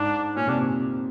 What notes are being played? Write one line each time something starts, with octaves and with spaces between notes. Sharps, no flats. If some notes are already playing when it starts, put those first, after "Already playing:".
Already playing: G#2 D4
A#2 C#4
C3 D4